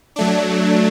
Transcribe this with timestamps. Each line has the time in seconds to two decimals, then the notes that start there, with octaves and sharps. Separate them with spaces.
0.16 F#3 A3 D4